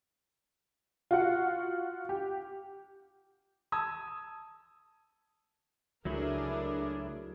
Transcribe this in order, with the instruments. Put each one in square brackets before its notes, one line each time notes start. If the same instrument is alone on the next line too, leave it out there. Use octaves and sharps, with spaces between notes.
[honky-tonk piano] F4 F#4 F#5
G4
[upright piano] A5 D#6 E6 G#6
[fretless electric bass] C#2 [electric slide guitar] F#3 A3 E4 [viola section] D4 G#4 A#4